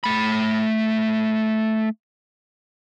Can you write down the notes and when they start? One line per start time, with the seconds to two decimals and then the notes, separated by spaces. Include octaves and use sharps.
0.04 A3 B5